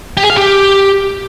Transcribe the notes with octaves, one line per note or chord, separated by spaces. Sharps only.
G4
G#4
F5
G4